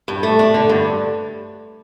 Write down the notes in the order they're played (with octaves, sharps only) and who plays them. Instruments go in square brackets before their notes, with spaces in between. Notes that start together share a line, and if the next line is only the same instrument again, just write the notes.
[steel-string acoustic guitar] G2
A3
D4
D3
G2